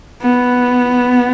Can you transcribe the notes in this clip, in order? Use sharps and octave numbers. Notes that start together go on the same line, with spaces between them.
B3